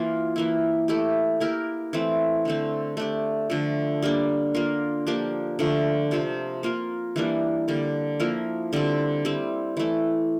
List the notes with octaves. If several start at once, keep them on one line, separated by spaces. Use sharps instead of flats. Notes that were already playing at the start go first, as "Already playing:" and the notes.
Already playing: E3 A#3 F4
E3 A#3 E4
A3 E4 G4
A#3 E4 G4 A#4
E3 A3 C4
D3 A3 C4
A3 D4 G4
D3 F3 A3
G3 A#3 D4
A#3 F4 A#4
F3 A#3 D4 G4
D3 F3 A3
C3 F3 C4
A#3 F4 A#4
E3 G3 A#3 D4
D3 G3 A#3
F3 A#3 E4 A#4
D3 G3 C4
G3 C4 E4
E3 A3 E4